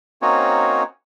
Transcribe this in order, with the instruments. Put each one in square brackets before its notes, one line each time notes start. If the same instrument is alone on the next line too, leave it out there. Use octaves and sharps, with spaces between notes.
[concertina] A#3 C4 C#4 D#4 F#4 C#5